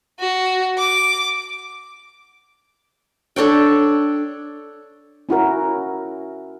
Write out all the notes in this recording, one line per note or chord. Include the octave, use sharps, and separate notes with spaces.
F#4
D6
D4 A4 C#5 G5
C#4 E4 F#4 A#4